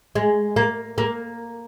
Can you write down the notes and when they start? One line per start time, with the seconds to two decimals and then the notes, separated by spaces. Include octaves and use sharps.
0.15 G#3
0.56 A#3
0.98 A#3